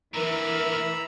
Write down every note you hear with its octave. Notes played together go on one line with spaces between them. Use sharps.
A#2 D3 E3 A#4 A#5 B5 E6